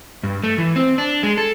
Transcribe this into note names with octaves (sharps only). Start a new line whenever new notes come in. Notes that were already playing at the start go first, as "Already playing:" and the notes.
G2
A3
E3
C4
D4
G#3
A4